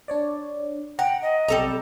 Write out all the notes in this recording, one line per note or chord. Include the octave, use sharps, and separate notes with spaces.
D4 C#5 D5
F#5 G5 A#5
D#5
B1 C3 G3 A4 A#5